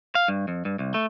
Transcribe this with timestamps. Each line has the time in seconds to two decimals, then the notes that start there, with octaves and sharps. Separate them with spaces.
0.15 F5
0.28 G2
0.48 F2
0.65 G2
0.79 C2
0.94 A3